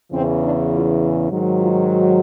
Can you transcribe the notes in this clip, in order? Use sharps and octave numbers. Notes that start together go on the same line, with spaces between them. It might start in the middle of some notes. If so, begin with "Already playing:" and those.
E2 C#3 E3 C4
D4
F4
G#2 D#3 F#3
F4
F#4